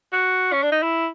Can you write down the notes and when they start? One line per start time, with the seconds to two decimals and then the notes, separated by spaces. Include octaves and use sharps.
0.13 F#4
0.53 C#4
0.63 D4
0.72 D#4
0.82 E4